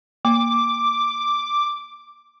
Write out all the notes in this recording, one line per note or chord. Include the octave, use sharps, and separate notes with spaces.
A#3 D6